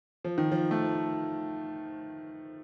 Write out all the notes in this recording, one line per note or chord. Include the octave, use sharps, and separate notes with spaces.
F3
D#3
F3
A3